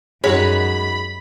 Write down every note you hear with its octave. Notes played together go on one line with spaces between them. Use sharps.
F#2 G#3 D#4 F#4 C#5 B5